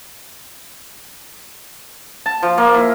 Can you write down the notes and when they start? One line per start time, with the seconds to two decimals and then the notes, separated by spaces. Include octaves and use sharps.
2.26 A5
2.43 F3
2.58 A#3
2.74 E4